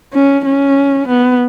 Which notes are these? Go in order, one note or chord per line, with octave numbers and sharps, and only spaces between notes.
C#4
C#4
B3